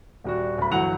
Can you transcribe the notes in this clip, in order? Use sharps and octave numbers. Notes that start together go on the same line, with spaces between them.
D#1 G3 F#4
D1 B5
G1 E3 F#3 F#5 F7